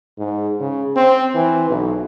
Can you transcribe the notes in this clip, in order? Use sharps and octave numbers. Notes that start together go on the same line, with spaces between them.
G#2
C#3
C4
E3
B1